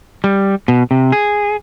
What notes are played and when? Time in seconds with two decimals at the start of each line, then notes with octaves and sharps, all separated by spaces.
0.24 G3
0.68 B2
0.91 C3
1.12 G#4